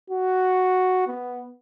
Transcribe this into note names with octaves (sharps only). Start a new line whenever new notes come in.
F#4
B3